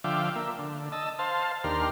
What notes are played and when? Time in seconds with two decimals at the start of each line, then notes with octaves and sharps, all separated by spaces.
0.04 D3 F3 E5 F5 G5 D6
0.36 A#3 E5
0.59 D3
0.92 D#5 A5 E6
1.19 C5 F5 A5
1.64 D#2 D4 G4 A#4 C6 F6